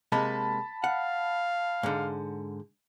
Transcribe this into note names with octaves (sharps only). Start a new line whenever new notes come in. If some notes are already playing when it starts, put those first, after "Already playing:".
C3 G#3 A#3 A5 B5
F5 F#5
G#2 D3